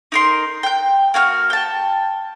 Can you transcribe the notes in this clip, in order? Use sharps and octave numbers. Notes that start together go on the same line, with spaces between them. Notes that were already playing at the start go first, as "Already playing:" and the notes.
D#4 A#4 C6
G5 G6
A#3 F#4 G#5 F6
G5 A5